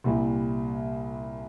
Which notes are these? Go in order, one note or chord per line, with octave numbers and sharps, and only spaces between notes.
C2 A#2 G3 A#3 E4